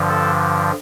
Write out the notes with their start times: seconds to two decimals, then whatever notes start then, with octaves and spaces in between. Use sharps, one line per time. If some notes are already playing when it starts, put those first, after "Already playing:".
Already playing: G2 D3 F3
0.09 A4